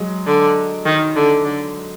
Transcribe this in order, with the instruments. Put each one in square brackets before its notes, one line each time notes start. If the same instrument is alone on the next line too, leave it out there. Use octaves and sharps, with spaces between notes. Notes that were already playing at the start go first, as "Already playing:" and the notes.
Already playing: [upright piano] F#3 G#3
[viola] D3
D#3
D3
D3